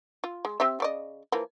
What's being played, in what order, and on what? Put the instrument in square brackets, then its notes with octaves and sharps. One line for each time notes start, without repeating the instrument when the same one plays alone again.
[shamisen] F4
G#3
C4 G4 E5
C#3 D5 D#5
E3 F3 A#3